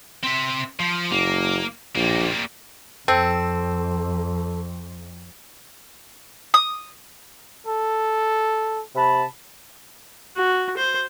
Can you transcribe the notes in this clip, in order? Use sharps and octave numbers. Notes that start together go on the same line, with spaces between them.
C4 E5
F3
F#1 A#3
A#1 G3 A#3
F2 C4 A4
D#6
A4
C3 A5 B5
F#4
C5